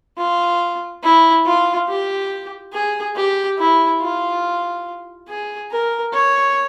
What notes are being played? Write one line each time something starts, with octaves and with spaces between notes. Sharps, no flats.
F4
E4
F4
G4
G#4
G4
E4
F4
G#4
A#4
C#5